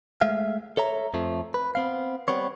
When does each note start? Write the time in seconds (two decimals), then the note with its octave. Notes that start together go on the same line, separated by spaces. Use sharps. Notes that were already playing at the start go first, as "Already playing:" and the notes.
0.21 G#3 A3 E5 F5
0.77 A4 C#5 E5 A#5
1.14 F2 F3 A3
1.54 B4
1.75 B3 C4 F5
2.28 G3 B3 C4 C#5